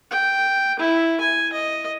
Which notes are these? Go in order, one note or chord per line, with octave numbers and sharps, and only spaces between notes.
G5
E4
G#5
D#5